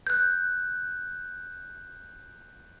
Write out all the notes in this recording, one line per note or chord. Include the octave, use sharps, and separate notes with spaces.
F#6 G6